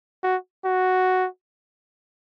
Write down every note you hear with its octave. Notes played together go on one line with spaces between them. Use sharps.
F#4
F#4